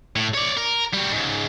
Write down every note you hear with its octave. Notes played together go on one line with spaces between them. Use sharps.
A2
C#5 D5
A#4
G3 F#4
G#2 C#3